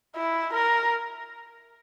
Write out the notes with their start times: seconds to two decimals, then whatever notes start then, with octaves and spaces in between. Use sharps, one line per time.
0.16 E4
0.53 A#4